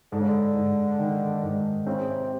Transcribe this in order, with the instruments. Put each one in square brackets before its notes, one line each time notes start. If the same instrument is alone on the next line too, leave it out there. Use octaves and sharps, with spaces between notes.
[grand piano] G#2 [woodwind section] D3
[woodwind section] C#3
D3
[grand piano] G#2
D#3
G#2
[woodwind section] C#3 [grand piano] C4
[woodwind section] C3
C3